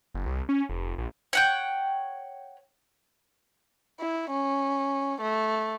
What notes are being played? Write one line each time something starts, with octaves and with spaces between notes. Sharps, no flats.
F#1
C2
C#4
F1
A#1
C#5 F#5 G5
E4
C#4
A3